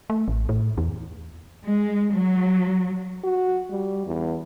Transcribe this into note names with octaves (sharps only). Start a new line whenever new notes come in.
A3
A1
A2
E2
G#3
F#3
F#4
G3
E2